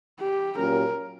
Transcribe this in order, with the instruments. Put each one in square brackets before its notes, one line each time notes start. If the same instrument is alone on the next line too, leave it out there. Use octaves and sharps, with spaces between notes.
[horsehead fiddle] G4
[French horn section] A#2 F#3 C#4 G4 [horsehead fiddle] A#4